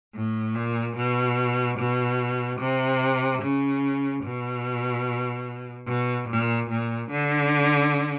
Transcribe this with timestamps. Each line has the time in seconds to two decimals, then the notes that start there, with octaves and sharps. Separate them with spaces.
0.15 A2
0.55 A#2
0.96 B2
1.78 B2
2.60 C3
3.42 C#3
4.24 B2
5.88 B2
6.29 A#2
6.70 A#2
7.11 D3